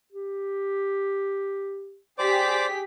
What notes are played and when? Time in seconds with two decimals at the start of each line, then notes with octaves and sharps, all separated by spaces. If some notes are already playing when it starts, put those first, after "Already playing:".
0.13 G4
2.18 G4 G#4 C5 D5 D6 B6